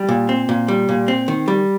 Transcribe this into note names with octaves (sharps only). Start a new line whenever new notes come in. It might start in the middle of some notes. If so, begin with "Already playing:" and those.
Already playing: G3
A#2
C4
A#2
G3
A#2
C4
D#3
G3